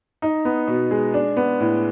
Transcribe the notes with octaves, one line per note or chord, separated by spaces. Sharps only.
D#4
B3
B2
G#3
D4
B3
A2